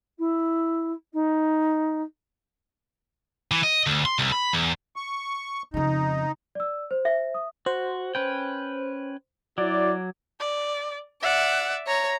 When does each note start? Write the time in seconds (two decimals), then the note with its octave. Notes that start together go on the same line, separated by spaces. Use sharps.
0.18 E4
1.13 D#4
3.51 E3
3.63 D#5
3.87 D2
4.05 C6
4.19 C2
4.32 B5
4.53 E2
4.96 C#6
5.74 F2 C#3 D#4
6.55 D5 E6
6.91 C5
7.05 E5
7.34 D#6
7.66 F#4 C5
8.15 C#4 B4 G5
9.58 F#3 E4 F#4 D5 D6
10.40 D5
11.22 D5 E5 F#5
11.87 C#5 A#5